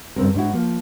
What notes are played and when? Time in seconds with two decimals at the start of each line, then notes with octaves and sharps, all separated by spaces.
0.16 G2 C#3 C4 A#4
0.34 G#2 D4 E4 F#4
0.53 F3 A#3